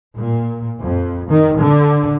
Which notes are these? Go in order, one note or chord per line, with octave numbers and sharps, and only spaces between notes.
A#2
F2
D#3
D3